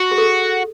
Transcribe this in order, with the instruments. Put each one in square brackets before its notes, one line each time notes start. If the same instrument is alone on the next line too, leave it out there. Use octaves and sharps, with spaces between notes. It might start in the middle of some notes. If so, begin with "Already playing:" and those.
Already playing: [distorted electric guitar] F#4
[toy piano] G#4
A4